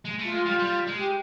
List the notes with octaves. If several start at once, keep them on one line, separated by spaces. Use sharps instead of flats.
G#3
A3 F4
G#3
G3 F4
G3 F4
G#3
G4